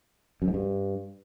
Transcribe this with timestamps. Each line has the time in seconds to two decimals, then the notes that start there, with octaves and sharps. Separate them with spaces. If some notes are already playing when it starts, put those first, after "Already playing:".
0.42 F#2
0.48 G#2
0.54 G2